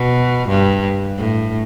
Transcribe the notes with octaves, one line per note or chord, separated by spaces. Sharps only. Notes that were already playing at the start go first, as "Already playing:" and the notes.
Already playing: B2
G2
A2